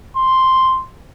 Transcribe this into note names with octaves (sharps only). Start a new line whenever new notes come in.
C6